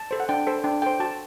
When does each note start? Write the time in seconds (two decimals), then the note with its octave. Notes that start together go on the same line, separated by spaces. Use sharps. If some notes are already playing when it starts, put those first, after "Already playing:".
Already playing: A5
0.11 A4 C5
0.20 F#5
0.29 D4 G5
0.47 A4 C5
0.64 D4 G5
0.82 A4 C5 G5
1.00 F#4 A5